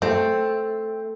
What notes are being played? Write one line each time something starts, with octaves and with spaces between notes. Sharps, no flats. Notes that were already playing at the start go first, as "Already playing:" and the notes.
A3 C4